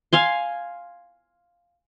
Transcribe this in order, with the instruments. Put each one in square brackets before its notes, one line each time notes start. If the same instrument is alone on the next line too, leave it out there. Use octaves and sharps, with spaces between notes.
[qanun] F5 G#5 C6